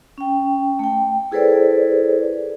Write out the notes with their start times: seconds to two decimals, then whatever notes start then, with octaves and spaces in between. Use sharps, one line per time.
0.18 C#4 G5
0.79 A3 G5
1.32 E4 G#4 A4 B4 C5 D5